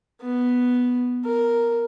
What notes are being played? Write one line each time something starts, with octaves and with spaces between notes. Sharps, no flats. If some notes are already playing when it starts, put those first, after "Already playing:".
B3
A#4